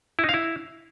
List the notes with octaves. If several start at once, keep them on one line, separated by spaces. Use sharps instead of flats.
E4
D#4
F5
E4